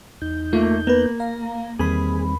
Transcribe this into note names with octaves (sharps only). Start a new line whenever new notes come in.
E2 D#4 G6
A3 A#3 F4
A#3 B3 B4
F5 A#5
E2 D#3 G3 A#3 C4 G#4 B5